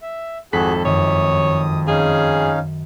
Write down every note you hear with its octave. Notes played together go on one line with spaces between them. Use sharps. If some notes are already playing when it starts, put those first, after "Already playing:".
E5
G#1 F2 F#4 G#4 A4 F#6 B6
F#2 D#3 C#5 D#6
C#4 D#4 G#4 F5